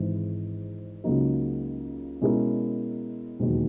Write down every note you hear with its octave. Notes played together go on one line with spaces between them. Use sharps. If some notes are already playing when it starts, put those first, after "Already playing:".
Already playing: G#1 G#2 E3
C#2 C#3 F#3 A#3 D#4
B2 G#3 C#4 E4 A#4
E1 D#2 D#3 F#3